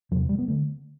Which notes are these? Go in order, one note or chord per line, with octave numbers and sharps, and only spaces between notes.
E2 C3 F#3
G3
B3
D3 A3